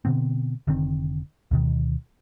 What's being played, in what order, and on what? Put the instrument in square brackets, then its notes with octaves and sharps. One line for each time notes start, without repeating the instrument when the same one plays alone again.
[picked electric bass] B2 D3 B3 C4
F1 D3 D#3 C4
D2 B2 D#3